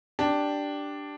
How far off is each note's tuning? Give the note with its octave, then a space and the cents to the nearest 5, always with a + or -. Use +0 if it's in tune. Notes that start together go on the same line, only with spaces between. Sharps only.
D4 +0 G4 +0